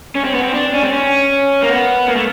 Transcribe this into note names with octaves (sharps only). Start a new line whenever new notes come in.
C#4
C4
B3
C4
D4
C#4
C4
C#4
A#3
B3
A#3
A3